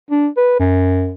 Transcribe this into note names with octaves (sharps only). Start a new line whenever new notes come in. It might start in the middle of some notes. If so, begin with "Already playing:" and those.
D4
B4
F#2